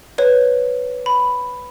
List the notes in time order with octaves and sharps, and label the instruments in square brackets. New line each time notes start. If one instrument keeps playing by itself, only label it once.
[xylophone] B4 C#5
B5